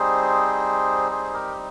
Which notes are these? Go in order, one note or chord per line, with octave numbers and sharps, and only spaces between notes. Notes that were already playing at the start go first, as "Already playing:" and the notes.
Already playing: G3 C4 D#4 G#4 C5
G#4 C5
G4 A#4